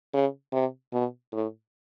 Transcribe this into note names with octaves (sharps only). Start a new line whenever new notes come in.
C#3
C3
B2
A2